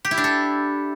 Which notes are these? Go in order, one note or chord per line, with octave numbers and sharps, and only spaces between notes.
G4
E4
D4
A4